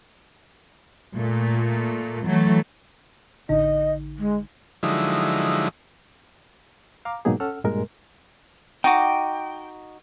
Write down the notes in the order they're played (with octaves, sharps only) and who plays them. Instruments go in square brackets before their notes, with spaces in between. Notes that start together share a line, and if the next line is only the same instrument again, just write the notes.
[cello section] A#2 A3
E3 F#3 A3
[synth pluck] A1 D3 D#4 [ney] D#5
[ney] G#3
[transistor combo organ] D3 F3 F#3 G#3 D#4 E4
[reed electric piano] F5 A#5 D6
G#2 B2 F#3 A#3 D#4 G#4
C#4 A4 F#5 E6 F6
G2 A#2 G#3 A#4
[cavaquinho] D#4 F#4 D6 [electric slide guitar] G5